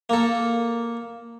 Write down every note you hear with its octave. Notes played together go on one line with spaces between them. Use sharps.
A#3 A4